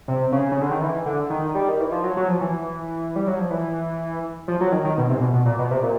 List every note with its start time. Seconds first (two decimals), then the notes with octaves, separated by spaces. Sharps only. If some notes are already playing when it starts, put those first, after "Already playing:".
0.08 C3
0.32 C#3
0.52 C#3
0.62 D3
0.71 D#3
0.81 E3
1.06 D3
1.30 D#3
1.55 G3
1.69 D#3
1.80 E3
1.92 F3
2.04 F#3
2.17 F#3
2.28 F3
2.41 E3
3.16 G3
3.27 F#3
3.39 F3
3.51 E3
4.48 F3
4.61 F#3
4.72 D#3
4.84 D#3
4.98 B2
5.10 C3
5.17 A#2
5.21 B2
5.33 B2
5.45 A#2
5.59 B2
5.71 C3
5.83 A#2